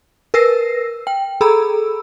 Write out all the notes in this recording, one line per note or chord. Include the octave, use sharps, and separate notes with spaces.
A#4 B4 E6 A#6 C7
G5
G#4 A4 A#5 B5 E6